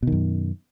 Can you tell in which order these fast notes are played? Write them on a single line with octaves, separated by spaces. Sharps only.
B2 D#3 F#2